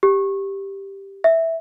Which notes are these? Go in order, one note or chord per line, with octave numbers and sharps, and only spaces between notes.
G4
E5